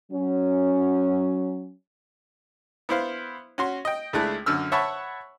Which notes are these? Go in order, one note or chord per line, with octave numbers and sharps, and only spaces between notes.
F#3 C#4
B3 E4 C5 F5
C#4 F#4 C6
D#5 G5
C#2 G#3 A3 D4 E4 F#6
F#2 D3 E6 F6
C#5 E5 F#5 A5 B5 C#6